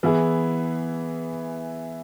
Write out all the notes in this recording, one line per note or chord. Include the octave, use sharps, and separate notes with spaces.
E3 B3 E4 G#4